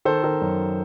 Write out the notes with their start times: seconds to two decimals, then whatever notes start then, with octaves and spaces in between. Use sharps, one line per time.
0.05 D#3 A4 C5
0.24 D#3
0.42 F#2